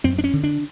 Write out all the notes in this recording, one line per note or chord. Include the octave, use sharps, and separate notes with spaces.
F#2 C4
D4
C#4
D3
D4